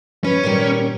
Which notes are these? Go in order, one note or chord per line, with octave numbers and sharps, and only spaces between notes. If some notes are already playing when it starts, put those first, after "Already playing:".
C#4 B4
A#2 D#3 G3